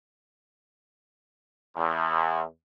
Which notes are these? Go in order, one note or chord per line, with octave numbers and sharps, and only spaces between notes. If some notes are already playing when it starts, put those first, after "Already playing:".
E2